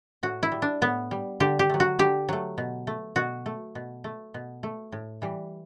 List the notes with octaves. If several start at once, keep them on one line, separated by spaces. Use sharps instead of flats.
A2 F#4
E4
G3
D4
A2 B3
G3
D3 G4
G4
F#3 A3
F#4
D3 G4
F#3 A3
B2
A3
B2 F#4
A3
B2
A3
B2
A3
A2
E3 G3